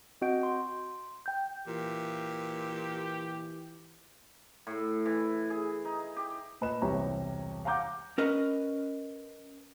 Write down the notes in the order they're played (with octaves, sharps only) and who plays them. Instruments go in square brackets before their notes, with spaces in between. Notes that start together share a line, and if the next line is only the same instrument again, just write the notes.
[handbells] C4 F#4 D#5 F#5 G6 D7
C6
G5 G6
[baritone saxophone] A#2 [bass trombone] E3 [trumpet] G4
[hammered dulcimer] A2
E3
G#4
D#4
G4
[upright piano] A#2 B4 D#5 E7
E1 C2 C3 G4 C#5 A#5
F5 F#5 A#5 D6 G6
[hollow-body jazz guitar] C#4 A#4 B4 D#5